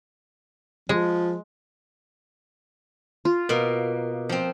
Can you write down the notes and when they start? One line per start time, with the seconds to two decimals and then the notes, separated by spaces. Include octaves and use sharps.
0.89 F3 G#3
3.25 F4
3.49 B2 A#3
4.29 F3 C4